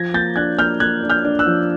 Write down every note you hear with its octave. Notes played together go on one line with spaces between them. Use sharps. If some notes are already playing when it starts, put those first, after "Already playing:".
Already playing: F3 G#6 A#6
A#3 G6 A6
D4 F#6 G#6
A#3 F6 G6
A#3 F#6 G#6
D4
F6 G6
D4
E6 F#6
F3